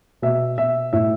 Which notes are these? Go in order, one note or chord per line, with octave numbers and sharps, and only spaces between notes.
B2 E5
B2 E5
A2 E5